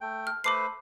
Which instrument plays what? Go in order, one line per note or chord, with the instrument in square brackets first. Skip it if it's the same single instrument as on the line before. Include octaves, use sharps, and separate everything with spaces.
[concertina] A3 G5
[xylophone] F6
[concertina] A3 B4 C5 [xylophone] B5 D6 C7